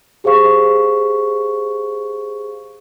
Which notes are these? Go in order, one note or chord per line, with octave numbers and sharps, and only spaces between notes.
G4 G#4 C5 F5 C#6